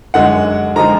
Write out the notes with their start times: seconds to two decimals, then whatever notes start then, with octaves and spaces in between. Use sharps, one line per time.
0.14 F#2 D3 G#3 D#4 F#5
0.76 D3 F3 G#3 D#4 A#5